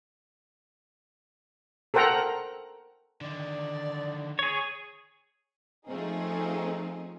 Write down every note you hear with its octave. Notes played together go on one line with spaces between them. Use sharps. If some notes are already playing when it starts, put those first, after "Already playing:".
A4 A#4 C5 F#5 G5 A#5
D3 D#3 D5
G#4 C#5
F3 A3 C4 C#4 D#4 G#4